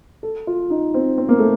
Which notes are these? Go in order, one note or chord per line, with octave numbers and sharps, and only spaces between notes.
A4
F4
D#4
C4
C4
A#3
A3